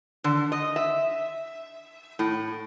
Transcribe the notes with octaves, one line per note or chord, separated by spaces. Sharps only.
D3
D#5
E5
A2